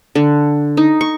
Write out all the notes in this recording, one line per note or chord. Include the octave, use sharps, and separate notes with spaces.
D3
D#4
C#6